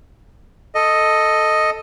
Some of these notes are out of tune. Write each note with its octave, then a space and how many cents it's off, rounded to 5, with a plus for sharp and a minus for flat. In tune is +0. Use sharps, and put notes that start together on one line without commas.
A4 +5 D#5 +0